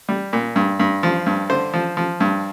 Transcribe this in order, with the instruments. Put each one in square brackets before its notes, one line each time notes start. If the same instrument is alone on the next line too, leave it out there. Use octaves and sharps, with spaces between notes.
[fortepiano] G3
A#2
G2
G2
F3
G2
D3 C5
F3
F3
G2